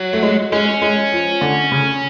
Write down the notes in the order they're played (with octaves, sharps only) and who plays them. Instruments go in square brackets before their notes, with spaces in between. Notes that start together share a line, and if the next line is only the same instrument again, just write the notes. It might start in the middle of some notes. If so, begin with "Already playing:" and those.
Already playing: [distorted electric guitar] F#3
[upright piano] A3
G#3
[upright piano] G#3 [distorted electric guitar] C#4
[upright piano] G#3
F3
D3
C#3